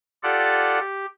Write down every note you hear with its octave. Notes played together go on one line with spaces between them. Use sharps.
F4 G4 A4 D5 F#5
G4